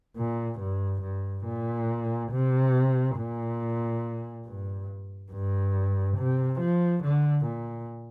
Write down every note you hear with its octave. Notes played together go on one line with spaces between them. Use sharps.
A#2
G2
G2
A#2
C3
A#2
G2
G2
C3
F3
D3
A#2